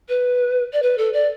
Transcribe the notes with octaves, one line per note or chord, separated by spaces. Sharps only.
B4
D5
B4
A4
D5